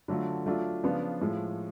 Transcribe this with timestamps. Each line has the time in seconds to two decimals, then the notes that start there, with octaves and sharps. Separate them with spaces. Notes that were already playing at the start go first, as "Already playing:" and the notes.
0.08 D3 F#3 A3 F4
0.46 F#3 A3 D4 F4
0.84 C#3 F3 B3 D4 F4
1.21 A2 F3 G#3